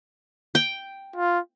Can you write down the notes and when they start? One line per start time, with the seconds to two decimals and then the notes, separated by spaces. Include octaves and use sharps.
0.55 G5
1.16 F4